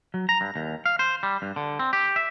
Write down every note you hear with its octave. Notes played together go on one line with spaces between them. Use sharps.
F#3
A#5
G2
D#2
F5
C5
G3
G2
D3
C4
G4
E5